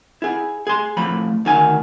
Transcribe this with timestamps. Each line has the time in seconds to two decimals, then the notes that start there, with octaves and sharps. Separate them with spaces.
0.22 E4 G#4
0.67 G#4 C6
0.97 A2 F3 B5
1.45 D2 D#3 G#5